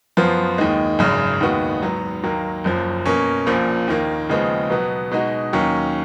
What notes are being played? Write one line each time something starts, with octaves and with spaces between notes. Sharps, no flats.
F#2 F3 B3 F4
D#2 D#3 G#3
G#1 F#2 C#3
D#2 D#3 G#3 B3 F#4
G#2 F#3 B3
D#2 D#3 F#3 A#3
F#1 F#2 F3
B2 A#3 C#4
A#1 A#2 F3
D#2 D#3 A#3
D#2 C#3 F3 G#3 B3
B2 F#3 B3
B2 G#3 D#4 F#4
D#2 D#3 F#3 C#4